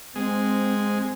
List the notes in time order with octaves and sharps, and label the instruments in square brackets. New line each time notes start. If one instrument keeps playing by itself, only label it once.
[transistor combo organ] G#3 [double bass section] C4